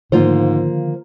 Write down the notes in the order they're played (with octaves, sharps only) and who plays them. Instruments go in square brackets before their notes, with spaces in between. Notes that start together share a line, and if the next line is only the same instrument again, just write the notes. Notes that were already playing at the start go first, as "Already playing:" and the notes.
[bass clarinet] G#2 [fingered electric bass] D3 D#3 F3 [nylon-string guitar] A#3 F4 C5